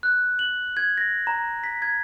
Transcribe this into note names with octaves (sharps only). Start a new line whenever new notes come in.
F#6
F#7
G#6
A#6
A#5
B6
G#6